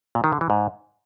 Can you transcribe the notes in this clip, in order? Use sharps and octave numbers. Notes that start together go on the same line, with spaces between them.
A#2
D#3
D3
E3
G#2